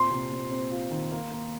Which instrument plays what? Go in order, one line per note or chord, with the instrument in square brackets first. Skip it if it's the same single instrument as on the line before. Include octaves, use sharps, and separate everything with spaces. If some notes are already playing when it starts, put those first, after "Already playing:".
Already playing: [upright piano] A#2 C4 [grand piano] C6
[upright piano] C3
C3
C4
F4
D#3
A#3
A#3